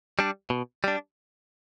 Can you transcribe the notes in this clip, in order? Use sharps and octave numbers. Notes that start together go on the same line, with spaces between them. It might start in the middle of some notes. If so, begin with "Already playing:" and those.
G3 D4
B2
G3 D4